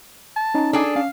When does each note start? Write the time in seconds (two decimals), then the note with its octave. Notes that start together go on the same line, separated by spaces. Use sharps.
0.36 A5
0.55 C#4 D#4
0.73 D4 G#4 A4 G#5
0.96 C#4 F5